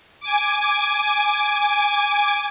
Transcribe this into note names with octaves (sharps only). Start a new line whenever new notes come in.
G#5 D6